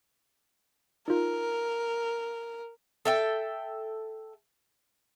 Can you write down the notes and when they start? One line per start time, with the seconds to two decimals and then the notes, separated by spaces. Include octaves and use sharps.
1.08 D#4 F4 A#4
3.05 A4 E5 G5